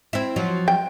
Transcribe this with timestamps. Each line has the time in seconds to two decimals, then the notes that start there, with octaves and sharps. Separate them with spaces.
0.13 C4 E4
0.36 F3 F#3
0.68 G5